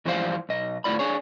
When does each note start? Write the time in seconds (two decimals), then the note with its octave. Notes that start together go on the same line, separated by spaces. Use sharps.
0.05 G#2 E3 F3 G3 C5 F5
0.49 B1 D#5
0.84 D2 A2 F4 D5 B5
0.99 D4 G#4 C#5